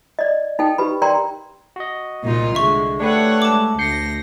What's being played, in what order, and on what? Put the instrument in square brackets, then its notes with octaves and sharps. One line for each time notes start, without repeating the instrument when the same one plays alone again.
[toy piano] D5 D#5
D#4 A4 G5
G4 B4 B5
A#4 D5 G5 A#5 C6
[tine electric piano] F#4 D#5
[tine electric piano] C2 [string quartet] A#2 D#4 F4
[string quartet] D3 G#3 [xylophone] E5 C#6
[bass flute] A3 [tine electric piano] D4 G4 B4 [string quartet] C#5 F#5
[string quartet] G#3 [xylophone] A5 D6
[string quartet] D2 A#6 [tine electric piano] G6 C7 C#7